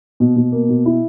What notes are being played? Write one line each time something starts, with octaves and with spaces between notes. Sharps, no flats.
B2
B2
A#3
B2
E4